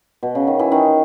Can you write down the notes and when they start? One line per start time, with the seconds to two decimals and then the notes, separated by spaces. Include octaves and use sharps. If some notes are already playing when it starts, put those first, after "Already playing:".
0.23 B2
0.35 C#3
0.47 D#3
0.59 E3
0.72 D#3